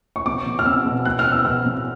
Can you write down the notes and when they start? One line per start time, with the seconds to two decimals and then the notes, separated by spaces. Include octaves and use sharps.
0.16 C#6
0.26 B2 D6
0.46 B2
0.59 F6
0.66 B2 E6
0.86 B2
1.05 B2 F#6
1.19 F6
1.26 B2
1.32 E6
1.45 B2 F6
1.66 B2